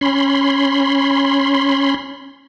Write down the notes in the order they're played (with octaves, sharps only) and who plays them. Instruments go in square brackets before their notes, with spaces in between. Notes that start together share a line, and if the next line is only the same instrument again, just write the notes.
[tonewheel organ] C#4 B5 C6